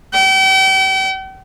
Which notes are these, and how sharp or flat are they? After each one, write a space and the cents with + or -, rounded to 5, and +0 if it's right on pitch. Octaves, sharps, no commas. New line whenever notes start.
G5 -40